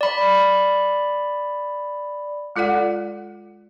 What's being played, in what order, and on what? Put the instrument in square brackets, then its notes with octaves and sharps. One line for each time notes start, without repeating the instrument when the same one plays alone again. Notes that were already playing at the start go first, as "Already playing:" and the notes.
[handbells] D5 B5
[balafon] G#3 F4 A4 D5 F#5